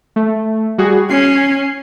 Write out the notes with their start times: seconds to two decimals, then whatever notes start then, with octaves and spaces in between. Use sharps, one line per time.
0.16 A3
0.78 G3 F#4 G#4
1.10 C#4 C7